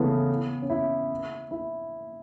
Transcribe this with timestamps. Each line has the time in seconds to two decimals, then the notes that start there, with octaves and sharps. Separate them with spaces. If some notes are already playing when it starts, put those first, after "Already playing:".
Already playing: C#3 E3 A3 B3
0.62 C#4
0.70 E4
1.51 E4